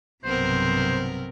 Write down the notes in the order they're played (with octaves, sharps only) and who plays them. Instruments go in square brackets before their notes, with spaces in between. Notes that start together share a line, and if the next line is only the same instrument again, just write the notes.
[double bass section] B1 G2 [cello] C3 F#3 [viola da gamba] B3 C4 A#4 [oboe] C5